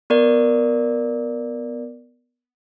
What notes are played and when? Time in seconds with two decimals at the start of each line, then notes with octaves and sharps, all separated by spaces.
0.10 B3 A#4 D5